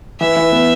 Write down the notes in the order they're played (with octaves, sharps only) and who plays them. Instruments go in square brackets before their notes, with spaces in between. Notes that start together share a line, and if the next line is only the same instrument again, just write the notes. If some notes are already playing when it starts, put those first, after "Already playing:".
[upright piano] E3 [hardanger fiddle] E5
[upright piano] E3
B3